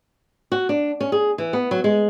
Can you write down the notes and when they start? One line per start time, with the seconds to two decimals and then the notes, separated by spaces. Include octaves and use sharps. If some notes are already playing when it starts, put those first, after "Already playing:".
0.52 F#4
0.69 D4
1.00 C#4
1.12 G#4
1.38 E3
1.53 B3
1.71 F#3
1.84 G#3